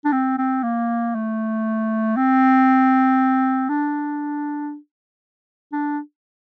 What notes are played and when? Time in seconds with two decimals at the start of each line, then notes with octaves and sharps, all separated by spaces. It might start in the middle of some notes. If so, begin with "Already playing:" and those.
0.05 D4
0.12 C4
0.38 C4
0.63 A#3
1.15 A3
2.17 C4
3.69 D4
5.73 D4